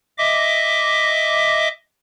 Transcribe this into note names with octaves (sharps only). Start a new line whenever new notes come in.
D#5 E5 D6